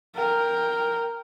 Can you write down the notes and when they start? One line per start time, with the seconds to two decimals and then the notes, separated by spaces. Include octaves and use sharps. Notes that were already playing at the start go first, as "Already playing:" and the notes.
0.15 A#4 G5